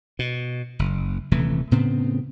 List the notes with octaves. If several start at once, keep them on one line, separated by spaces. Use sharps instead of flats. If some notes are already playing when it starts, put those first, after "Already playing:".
B2
F#1
D#1 C3 E3 A3
A2 C#3 B3 C4